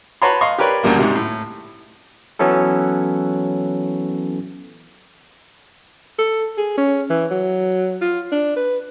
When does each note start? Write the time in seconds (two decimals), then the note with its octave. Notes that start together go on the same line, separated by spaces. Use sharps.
0.22 B4 C#5 F#5 A5 A#5 C6
0.41 D#5 F5 C6 C#6
0.58 G4 A#4 B4 C#5 D5
0.83 D2 A#2 C#3 G3 A#3
0.99 G#2 C3 G3
1.15 A2
2.39 E3 F#3 B3 C#4 E4 A4
6.18 A4
6.58 G#4
6.77 C#4
7.10 E3
7.31 F#3
8.01 F4
8.32 D4
8.56 B4